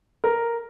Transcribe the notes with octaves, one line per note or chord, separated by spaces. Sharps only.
A#4